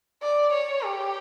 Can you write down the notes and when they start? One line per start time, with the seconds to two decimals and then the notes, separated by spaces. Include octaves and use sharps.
0.22 D5
0.53 C#5
0.84 G4